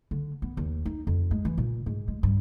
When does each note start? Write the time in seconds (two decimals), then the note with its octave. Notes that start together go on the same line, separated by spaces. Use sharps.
0.11 D3
0.42 B3
0.57 D#2
0.86 D#4
1.07 F2
1.31 G#3
1.45 E3
1.58 A#2
1.86 G#2
2.08 G#3
2.23 G2